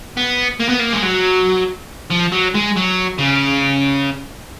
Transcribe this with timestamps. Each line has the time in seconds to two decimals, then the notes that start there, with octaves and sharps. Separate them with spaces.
0.17 B3
0.60 A#3
0.69 B3
0.79 A#3
0.92 G#3
1.02 F#3
2.10 F3
2.32 F#3
2.55 G#3
2.76 F#3
3.18 C#3